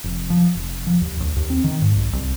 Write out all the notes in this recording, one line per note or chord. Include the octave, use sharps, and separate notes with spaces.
F1
F3
F1
F3
D#2
C#2
D#2
C4
D#3
G#2
B1
C2